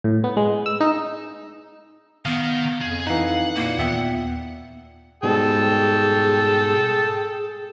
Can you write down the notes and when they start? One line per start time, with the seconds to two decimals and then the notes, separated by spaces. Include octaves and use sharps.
0.04 A2
0.24 B3
0.37 G#3
0.66 E6
0.80 D#4
2.26 D#3 B3 F5
2.81 F2 G#4
3.07 E3 D#4 F5 F#5
3.55 A#2 A#3
3.78 D#2 B3 E5 G5
5.23 G#2 B2 G3 G#4 A4 G5